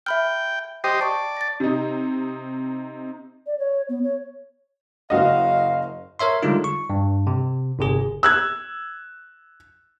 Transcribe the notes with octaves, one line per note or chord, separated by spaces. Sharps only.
E5 G5 B5 F6
G4 C5 D#5 G5
D5 A5 C#6
A6 A#6
C3 D#4
D5
C#5
B3
C#5
F#1 F#4 D#5 F5
A#4 C#5 E5 C6
D3 G3 G#3 D#4 F4
C#6
G2
C3
G1 C3 G#4
E6 F#6 G#6